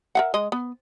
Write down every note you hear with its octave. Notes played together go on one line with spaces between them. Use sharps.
A#4 E5 F#5
G#3 D#5
B3